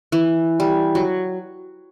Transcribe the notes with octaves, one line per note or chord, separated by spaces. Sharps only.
E3
G3
F#3